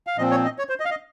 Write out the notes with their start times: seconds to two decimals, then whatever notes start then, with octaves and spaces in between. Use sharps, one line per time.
0.07 F5
0.17 A#2 F3 C4 D#5
0.31 C#5
0.45 D#5
0.58 C#5
0.69 C5
0.80 D#5
0.85 F5
0.90 D#5